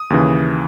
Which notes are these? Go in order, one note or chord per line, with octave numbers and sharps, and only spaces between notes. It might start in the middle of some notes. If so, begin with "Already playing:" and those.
Already playing: D#6
D#2 C#3 E3